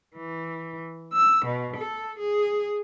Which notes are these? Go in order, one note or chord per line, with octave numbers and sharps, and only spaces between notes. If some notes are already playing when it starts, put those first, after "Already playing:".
E3
E6
B2
A4
G#4